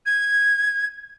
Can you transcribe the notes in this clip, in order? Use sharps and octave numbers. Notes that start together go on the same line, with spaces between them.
G#6